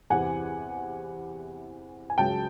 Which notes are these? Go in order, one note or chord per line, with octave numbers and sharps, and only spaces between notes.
E2 C3 E3 F#5 G#5
G#5
C#2 C#3 F#3 G5 A5